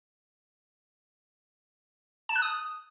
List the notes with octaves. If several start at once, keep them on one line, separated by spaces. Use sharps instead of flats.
A5
F#6
D#6